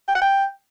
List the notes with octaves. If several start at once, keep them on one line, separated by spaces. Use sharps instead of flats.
G5
F#5
G5